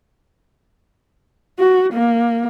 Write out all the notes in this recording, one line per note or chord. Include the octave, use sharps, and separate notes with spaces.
F#4
A#3